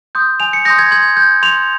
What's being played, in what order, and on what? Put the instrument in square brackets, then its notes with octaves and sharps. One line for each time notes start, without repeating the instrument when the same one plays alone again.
[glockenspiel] C6 D#6 G6
G#5 F7
C#7
C6 D#6 G6 A#6
G#6
C6 G#6
G6
C6 F7